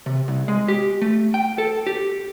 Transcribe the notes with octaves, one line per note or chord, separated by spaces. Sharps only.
C3
C2
G#3
G4
A3
G5
A4
G4